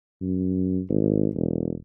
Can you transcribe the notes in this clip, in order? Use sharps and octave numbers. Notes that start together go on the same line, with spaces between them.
F#2
G#1
E1